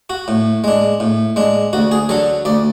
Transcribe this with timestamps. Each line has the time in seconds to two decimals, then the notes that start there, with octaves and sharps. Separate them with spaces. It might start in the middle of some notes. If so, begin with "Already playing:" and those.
0.10 F#4
0.28 A2
0.64 G#3 D4
1.00 A2
1.36 G#3 D4
1.73 D2 F#4
1.92 G#4
2.09 D3 F#3 A4
2.45 D2 D5